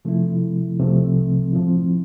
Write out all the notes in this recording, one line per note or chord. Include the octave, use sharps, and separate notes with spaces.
C3 F3 A3 E4
C2 C3 F3 A3 C4
A2 F3 C4 E4